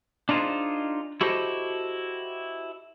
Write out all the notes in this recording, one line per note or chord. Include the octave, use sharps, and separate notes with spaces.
D4 D#4 F4 G#4 C5
E4 F#4 G4 A4 C5 D#5